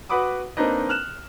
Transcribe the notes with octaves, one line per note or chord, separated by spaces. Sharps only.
F#4 B4 F#5 B5 D6 D#6
A#3 C4 D4 D#4 B4 D#5
F6 F#6 E7